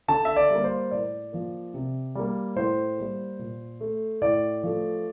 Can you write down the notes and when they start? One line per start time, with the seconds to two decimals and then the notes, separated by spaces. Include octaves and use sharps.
0.08 D3 A5
0.25 E5
0.36 D5
0.50 G3 A#3
0.64 C5
0.91 A2 D5
1.33 F3 A#3
1.74 C3
2.15 G3 A#3
2.56 A2 C5
2.98 G3 A#3
3.39 A#2
3.81 A3
4.22 A2 D5
4.63 F3 A3